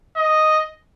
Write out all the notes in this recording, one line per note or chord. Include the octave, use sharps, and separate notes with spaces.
D#5